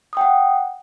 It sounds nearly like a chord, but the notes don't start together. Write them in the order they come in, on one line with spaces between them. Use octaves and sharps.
D#6 G5 F#5